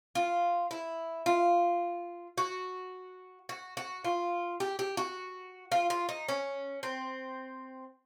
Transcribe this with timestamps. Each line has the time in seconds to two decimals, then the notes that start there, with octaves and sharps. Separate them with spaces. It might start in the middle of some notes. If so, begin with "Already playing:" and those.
0.15 F4
0.71 E4
1.26 F4
2.38 F#4
3.49 F#4
3.77 F#4
4.04 F4
4.60 G4
4.79 G4
4.97 F#4
5.72 F4
5.90 F4
6.09 D#4
6.28 C#4
6.83 C4